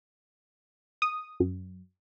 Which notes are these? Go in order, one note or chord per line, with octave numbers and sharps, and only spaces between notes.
D#6
F#2